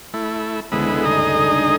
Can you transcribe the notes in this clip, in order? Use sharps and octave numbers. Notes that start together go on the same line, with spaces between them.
A3 E4
C#2 D3 G#3 B3 E4 C5
G1 D2 D#4 G#4 D#5
D3